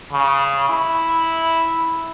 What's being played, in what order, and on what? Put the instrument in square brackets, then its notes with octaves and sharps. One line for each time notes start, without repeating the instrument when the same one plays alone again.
[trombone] C#3
E4